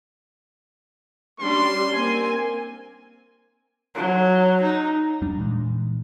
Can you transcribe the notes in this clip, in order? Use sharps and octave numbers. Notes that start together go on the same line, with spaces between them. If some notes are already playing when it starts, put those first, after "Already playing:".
G3 C#4 D4 C6
A#3 C4 G#5
F#3
D#4
F2 G3 D4
A#2 E3 G#3